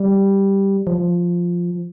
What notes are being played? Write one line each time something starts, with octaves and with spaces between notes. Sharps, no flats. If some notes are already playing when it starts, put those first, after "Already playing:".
Already playing: G3
F3